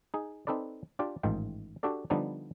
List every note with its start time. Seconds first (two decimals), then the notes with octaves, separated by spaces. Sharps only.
0.14 D#4 G#4
0.47 C4 D#4 A4 B4 D5
0.99 D4 F4 G4 D5 G5
1.23 A1 G#2 D#3 F4 G5
1.83 D4 F#4 G4 A4 D5
2.10 D3 F3 G3 B3 D4 D#4